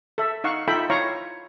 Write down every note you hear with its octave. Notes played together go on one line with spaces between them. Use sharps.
A4 E5
D#4 F5 F#5 C#6
D#4 F4 A4 E5 G5 B5
E4 C#5 F5 A#5 C#6